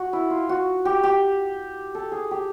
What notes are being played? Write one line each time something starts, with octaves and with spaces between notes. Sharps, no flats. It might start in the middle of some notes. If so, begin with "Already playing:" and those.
Already playing: F#4
E4
F4
F#4
G4
G4
A4
G#4
G4